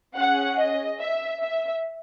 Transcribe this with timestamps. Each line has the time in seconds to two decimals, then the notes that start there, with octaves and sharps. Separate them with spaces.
0.16 C#4 G#4 F#5
0.59 D#5
1.00 E5
1.42 E5